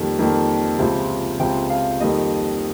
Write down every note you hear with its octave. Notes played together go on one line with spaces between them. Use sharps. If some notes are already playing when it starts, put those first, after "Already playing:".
Already playing: F2 D#3 G3 A#3
F2 D#3 G3 A#3
C#2 C3 F3
C#2 C3 F3 G5
F5
F2 D#3 G3 A#3 D#5